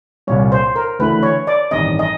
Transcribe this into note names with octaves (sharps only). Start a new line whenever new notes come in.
C2 A#2 G3 C#5
C5
A#4
D2 C#3 E3 A3 D4 B4
C#5
D5
A1 G2 D#3 G3 C4 D#5
D#5